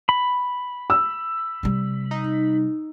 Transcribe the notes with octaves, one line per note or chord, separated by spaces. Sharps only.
B5
E6
C3 G3
D#4